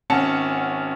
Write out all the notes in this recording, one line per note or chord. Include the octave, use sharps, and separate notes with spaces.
G#1 C#4 F#5 A5 C#7